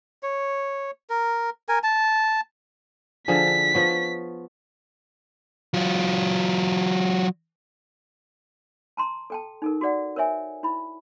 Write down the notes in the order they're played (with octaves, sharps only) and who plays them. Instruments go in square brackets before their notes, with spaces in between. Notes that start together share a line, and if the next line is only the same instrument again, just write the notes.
[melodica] C#5
A#4
A#4 G#5
A5
[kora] D3 F3 G#4 [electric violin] B6
[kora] F3 B3 C#5
[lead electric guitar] F#3 F4
[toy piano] A5 A#5 C6
A4 G5 A5
D#4 A4 A#4
F#4 G#4 D5 F#5
A#4 B4 C#5 E5 G#5
E4 B5